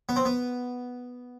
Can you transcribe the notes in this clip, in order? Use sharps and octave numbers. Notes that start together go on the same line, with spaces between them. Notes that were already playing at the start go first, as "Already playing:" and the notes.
B3
C4
B3